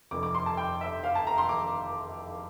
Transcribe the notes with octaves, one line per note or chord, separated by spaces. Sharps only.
F1 F2 C3 D6
D6
C6
A5
G5
E5
F5
A5
A#5
C6
D6